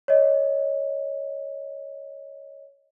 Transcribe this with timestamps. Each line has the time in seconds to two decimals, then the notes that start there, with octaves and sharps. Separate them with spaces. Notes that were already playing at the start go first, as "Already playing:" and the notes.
0.08 C#5 D#5